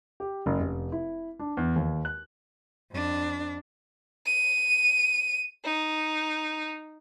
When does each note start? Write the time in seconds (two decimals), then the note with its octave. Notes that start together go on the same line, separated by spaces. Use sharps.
0.20 G4
0.46 F#1
0.60 F1
0.92 E4
1.39 D4
1.57 E2
1.76 D#2
2.05 F#6
2.91 F2 D4
4.26 D#7
5.65 D#4